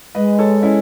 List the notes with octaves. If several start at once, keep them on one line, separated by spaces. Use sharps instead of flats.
G#3 B4 D#5
A4 C#5
C#4 E4